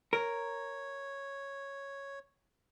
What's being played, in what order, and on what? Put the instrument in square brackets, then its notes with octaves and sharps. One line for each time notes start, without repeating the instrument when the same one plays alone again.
[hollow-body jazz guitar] A#4 [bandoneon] C#5